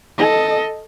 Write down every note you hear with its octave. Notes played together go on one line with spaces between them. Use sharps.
A4 D#5